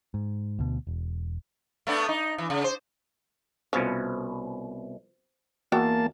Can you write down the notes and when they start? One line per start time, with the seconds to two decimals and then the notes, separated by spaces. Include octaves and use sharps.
0.14 G#2
0.59 D2 B2
0.87 E1
1.87 A3 B3 D4
2.09 D#4
2.38 E3
2.50 C#3
2.64 C5
3.73 C2 B2 F3 C#4
5.72 E2 A#3 F#4 G5 A5